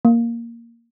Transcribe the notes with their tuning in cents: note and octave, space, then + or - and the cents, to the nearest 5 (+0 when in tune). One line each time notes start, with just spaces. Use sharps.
A#3 +0